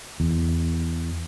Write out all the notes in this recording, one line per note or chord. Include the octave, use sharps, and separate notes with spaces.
E2